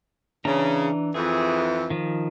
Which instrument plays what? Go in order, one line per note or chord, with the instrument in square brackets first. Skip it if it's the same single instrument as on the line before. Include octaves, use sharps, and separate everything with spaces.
[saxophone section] C#3 [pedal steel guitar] E3 D4 A#5
[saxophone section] F2 E3 [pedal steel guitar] G#4
[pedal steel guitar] D#3 F3